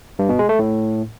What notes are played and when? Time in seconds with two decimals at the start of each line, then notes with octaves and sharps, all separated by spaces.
0.19 G2
0.29 B2
0.39 G#3
0.49 A3
0.59 A2